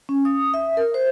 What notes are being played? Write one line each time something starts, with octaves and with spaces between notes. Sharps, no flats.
C#4
D#6
E5
A#4
C5